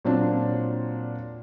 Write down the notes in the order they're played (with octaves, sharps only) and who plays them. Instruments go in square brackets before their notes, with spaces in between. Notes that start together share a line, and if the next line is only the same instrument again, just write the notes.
[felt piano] A#2 F#3 C4 D4 F4